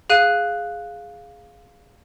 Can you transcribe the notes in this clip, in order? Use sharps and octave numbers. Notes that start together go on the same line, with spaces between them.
G#4 F5 F#6 D#7